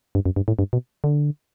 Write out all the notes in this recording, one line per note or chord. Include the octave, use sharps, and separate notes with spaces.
G2
F#2
G2
A2
G2
B2
D3